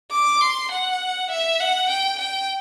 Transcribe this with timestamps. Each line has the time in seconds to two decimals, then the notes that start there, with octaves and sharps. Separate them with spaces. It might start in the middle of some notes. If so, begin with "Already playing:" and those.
0.12 D6
0.41 C6
0.71 F#5
1.31 E5
1.61 F#5
1.90 G5
2.19 G5